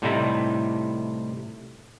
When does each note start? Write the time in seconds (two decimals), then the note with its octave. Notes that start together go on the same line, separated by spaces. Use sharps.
0.02 A2 C3 G3 A3 D#4 E4